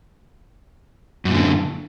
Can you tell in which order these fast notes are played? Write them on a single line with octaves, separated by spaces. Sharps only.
F#2 A#2 D3